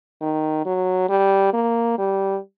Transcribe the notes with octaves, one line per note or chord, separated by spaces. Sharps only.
D#3
F#3
G3
A#3
G3